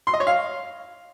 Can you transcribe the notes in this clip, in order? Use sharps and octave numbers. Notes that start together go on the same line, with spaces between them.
C6
D#5
C#5
F5